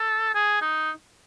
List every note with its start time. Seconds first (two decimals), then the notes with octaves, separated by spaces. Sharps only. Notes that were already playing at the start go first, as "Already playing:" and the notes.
Already playing: A4
0.34 G#4
0.62 D#4